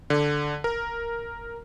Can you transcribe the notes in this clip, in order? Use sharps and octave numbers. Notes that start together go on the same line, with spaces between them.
D3
A#4